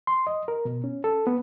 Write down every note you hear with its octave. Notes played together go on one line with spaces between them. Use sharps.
C6
D#5
A#4
B2
C#4
A4
B3